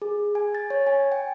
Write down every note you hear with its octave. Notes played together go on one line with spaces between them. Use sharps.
G#4
G#5
A6
C#5
G#5
G5